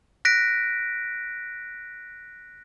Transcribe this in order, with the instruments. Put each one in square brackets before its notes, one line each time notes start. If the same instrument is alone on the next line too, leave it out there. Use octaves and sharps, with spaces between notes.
[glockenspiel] F#6 A#6 B6 D7